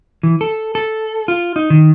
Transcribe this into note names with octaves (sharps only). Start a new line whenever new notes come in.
E3
A4
A4
F4
D#4
D#3